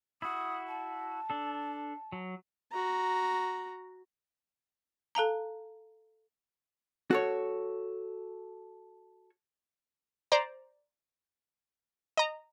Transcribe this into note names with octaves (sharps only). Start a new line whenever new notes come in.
E4 F#4 D#6
A5
D4 A4
F#3
F#4 A#5
A4 F5 A5 A#5
F#4 A4 C#5
C5 D5 A#5
D#5 A#5